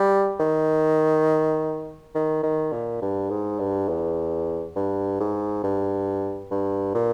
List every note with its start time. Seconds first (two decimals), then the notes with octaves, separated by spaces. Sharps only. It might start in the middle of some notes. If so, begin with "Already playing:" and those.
Already playing: G3
0.40 D#3
2.15 D#3
2.43 D#3
2.72 A#2
3.02 G2
3.30 G#2
3.60 G2
3.89 E2
4.76 G2
5.20 G#2
5.64 G2
6.51 G2
6.95 A#2